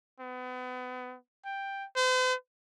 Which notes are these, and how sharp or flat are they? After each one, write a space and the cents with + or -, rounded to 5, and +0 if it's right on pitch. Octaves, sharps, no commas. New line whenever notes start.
B3 +35
G5 +5
C5 -45